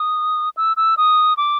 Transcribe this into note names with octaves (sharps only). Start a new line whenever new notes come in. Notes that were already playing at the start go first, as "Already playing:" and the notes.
Already playing: D#6
E6
E6
D#6
D6